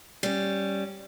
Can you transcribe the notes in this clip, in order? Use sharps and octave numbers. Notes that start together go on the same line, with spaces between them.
G3 C#4